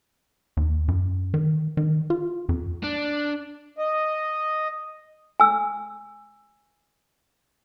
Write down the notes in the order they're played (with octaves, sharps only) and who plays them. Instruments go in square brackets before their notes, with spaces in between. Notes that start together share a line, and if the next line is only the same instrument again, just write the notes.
[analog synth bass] D#2
F#2
D#3
D#3
F4
F2
[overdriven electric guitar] D4
[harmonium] D#5
[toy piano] G#5 E6